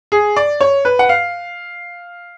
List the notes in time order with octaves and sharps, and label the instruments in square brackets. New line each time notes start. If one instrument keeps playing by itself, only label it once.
[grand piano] G#4
D5
C#5
B4
F#5
F5